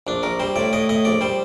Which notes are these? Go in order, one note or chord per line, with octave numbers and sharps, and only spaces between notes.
A#1 D4
A#1 A#4
G3 C5
A2 D5
A2 D#5
A2 D#5
A#1 D5
G3 C5